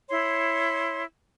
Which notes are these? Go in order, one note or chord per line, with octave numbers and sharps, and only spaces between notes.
E4 C#5 C6